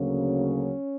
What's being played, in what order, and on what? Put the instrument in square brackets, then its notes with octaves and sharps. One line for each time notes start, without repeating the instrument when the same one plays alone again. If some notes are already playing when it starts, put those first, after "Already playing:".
Already playing: [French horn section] D2 C#3 F#3 A#3 C#4